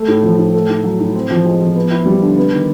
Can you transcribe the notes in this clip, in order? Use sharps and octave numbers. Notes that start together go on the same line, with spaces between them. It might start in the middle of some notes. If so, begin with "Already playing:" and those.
Already playing: A3
A2
F3
A2
A3
A2
F#3
A2
C4
F3
G#3
F3
B3
E4
G3
D3
B3
D#3